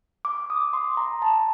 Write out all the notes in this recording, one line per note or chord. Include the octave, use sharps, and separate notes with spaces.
D6
D#6
C6
A#5
A5